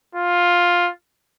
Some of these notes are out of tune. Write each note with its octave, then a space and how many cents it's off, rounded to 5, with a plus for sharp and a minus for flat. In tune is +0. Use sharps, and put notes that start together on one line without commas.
F4 +10